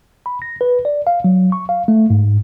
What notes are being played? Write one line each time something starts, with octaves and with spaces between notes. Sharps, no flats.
B5
A#6
B4
D5
F5
F#3
C#6
F5
A3
G#2